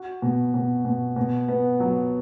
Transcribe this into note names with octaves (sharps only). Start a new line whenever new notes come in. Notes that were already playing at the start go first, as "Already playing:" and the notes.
Already playing: F#4
B2
B2
B2
B2
B3
F#3